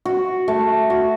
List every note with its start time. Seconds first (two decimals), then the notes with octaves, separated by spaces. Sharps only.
0.05 F#4
0.48 A3
0.90 F#4